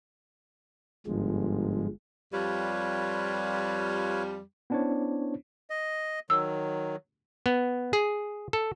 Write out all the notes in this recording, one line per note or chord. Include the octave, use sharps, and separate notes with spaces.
G1 G#2 F3 G#3
F2 G3 F4 B4 C#5
B3 C#4 D4 E4 C5 C#5
D#5
D#3 F#3 E6
B3
G#4
A4